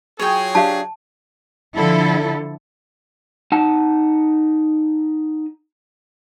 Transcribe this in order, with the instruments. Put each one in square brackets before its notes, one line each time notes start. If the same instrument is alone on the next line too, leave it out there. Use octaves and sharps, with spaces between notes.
[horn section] F#3 F4 G#4 [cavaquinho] C#5 G5
[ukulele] D4 G4 F5 [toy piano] A5
[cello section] D3 F3 E4 A4
[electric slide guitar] D#4 F#5 A5